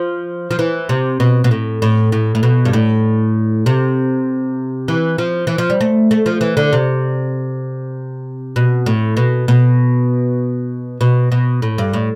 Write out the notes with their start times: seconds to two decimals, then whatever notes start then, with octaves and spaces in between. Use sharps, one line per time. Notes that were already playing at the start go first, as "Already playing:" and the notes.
Already playing: F3
0.51 F3
0.59 E3
0.89 C3
1.20 B2
1.44 B2
1.51 A2
1.82 A2
2.12 A2
2.35 A2
2.43 B2
2.65 G2
2.73 A2
3.66 C3
4.88 E3
5.18 F3
5.47 E3
5.58 F3
5.70 G3
5.81 A3
6.11 A3
6.26 F3
6.41 E3
6.57 D3
6.73 C3
8.56 B2
8.86 A2
9.17 B2
9.48 B2
11.01 B2
11.32 B2
11.62 A2
11.78 G2
11.93 A2